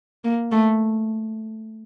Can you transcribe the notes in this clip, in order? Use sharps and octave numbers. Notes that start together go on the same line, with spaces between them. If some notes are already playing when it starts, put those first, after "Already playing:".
A#3
A3